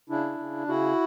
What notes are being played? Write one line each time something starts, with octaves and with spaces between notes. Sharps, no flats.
C#3 D4 E4
C#3
C#3 E4 F#4